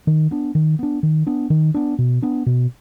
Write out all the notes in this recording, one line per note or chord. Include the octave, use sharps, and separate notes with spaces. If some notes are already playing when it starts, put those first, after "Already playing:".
D#3
B3 D4
D#3
B3 D4
D#3
B3 D4
D#3
B3 D4
B2
B3 D4
B2